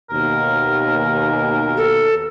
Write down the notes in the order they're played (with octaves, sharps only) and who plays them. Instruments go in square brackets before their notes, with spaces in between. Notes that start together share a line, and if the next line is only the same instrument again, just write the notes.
[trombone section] D#2 B2 [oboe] A#4
[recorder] A4